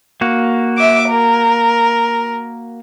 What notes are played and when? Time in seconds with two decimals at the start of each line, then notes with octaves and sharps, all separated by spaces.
0.21 A#3 F#4
0.78 E5 D6
1.09 A#4